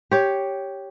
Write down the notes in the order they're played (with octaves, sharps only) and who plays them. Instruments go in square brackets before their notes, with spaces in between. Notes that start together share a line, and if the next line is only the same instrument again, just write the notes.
[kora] G4 C#5